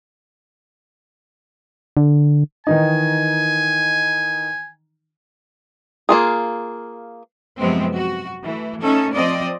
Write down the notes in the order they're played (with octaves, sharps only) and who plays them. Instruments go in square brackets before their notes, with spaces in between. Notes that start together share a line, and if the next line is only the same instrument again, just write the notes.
[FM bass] D3
[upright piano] D#3 E3 D#4 [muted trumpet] G#5
[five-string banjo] A#3 F4 G#4
[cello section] F#2 C3 F3 G#3 B3 C4
F#4
E3 A3
A3 C#4 D#4 A4
F3 C4 D5 D#5